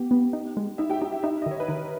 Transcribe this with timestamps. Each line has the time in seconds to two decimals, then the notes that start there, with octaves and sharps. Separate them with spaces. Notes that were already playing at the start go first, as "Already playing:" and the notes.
Already playing: B3 G4
0.11 B3
0.33 D#4
0.57 G#3
0.78 D#4 E4 E5
0.90 G4 G5
1.01 D#4 G4 G5
1.12 E4 E5
1.23 D#4 E4 E5
1.42 D#5
1.46 D#3 C#5
1.60 B4
1.68 D#3 A#4